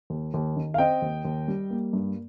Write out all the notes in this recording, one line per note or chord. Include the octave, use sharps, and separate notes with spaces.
D#2
D#2
D#3
F5
C4 D#5 G5
D#2
D#2
G3
A#3
G2